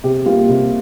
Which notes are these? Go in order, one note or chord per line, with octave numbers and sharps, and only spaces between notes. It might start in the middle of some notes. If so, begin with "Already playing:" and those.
C3 G4
G3 A#3 F4
C3